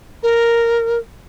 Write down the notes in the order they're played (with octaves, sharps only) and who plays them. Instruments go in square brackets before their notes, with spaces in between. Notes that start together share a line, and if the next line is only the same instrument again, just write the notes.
[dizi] A#4